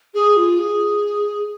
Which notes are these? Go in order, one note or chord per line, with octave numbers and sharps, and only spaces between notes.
G#4
F4
G#4